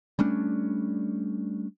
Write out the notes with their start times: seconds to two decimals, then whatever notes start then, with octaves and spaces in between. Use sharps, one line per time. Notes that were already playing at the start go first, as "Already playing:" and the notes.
0.19 G3 A3 C#4 D4